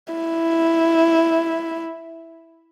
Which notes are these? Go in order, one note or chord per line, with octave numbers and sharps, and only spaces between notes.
E4